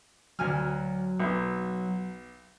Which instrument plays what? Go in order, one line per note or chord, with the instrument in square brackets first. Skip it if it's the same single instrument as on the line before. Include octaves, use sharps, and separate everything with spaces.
[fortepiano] D2 G#5 F6 [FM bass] F#3
[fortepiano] B1